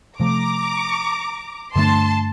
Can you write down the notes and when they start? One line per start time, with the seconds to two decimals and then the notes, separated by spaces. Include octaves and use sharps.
0.19 C3 F3 A3 A#5 D6
1.75 G2 D3 A3 D4 A5 C6